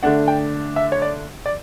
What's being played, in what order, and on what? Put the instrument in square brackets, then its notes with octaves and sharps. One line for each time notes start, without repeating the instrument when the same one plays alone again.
[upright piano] D3 A3 D4 F#5
G5
E5
C#5
D5
D5